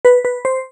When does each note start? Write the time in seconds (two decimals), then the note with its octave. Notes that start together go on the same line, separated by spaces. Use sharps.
0.05 B4
0.25 B4
0.45 C5